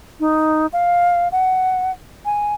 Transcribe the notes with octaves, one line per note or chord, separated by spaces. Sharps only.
D#4
F5
F#5
G#5